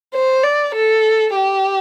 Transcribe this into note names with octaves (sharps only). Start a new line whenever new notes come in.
C5
D5
A4
G4